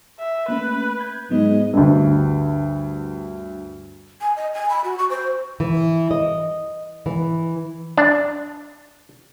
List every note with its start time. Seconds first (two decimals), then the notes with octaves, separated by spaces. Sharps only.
0.19 E5
0.48 A3 A#3 C#4 B4
1.00 G6 G#6
1.31 G#2 F#3 B3 D#5
1.73 D2 G2
4.21 G#5
4.36 D#5
4.54 G#5
4.70 B5
4.84 F#4
4.98 C#6
5.10 C5
5.60 E3
6.11 D#5
7.06 E3
7.98 D4